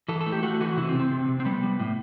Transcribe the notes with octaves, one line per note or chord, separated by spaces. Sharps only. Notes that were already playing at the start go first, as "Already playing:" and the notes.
E3 A4
A4
A3
G4
A3 F#4
E3 F#4
C3 E4
C4
C3
C4
C3
C3
C4
G3 B3
G3
A2